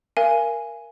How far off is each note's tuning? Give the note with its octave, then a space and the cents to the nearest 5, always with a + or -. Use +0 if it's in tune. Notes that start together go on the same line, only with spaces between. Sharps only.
A#4 +5 F5 -40 G#5 +0